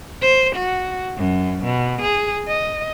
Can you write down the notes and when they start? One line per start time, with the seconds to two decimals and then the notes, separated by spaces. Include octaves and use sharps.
0.22 C5
0.55 F#4
1.17 F#2
1.64 B2
2.01 G#4
2.48 D#5